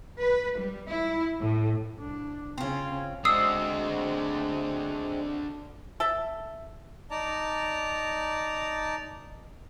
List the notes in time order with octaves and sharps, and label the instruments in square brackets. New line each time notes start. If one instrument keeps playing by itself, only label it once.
[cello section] B4
G3
E4
A2
[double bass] C2 D4
[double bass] C#3 C#4 [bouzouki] C4 F4
[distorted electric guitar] D3 F#4 [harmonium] G#3 C4 D4 [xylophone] D#6 E6 C7
[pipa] A4 E5
[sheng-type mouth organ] D#4 D5 A5 A#5